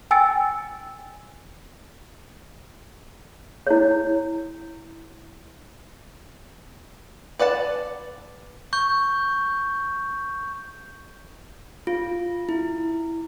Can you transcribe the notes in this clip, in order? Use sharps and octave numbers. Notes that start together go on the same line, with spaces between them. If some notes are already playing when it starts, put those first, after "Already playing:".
G5 G#5 E6 A6 C#7
E4 C#5
B4 D5 F#5 A5
C#6 G6
F4
E4